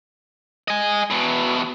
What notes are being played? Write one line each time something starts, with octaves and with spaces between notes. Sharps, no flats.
D#5 G#5
E2 B2